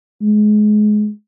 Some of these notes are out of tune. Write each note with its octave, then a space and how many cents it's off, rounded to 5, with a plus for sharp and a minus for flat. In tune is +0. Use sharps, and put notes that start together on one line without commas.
G#3 +25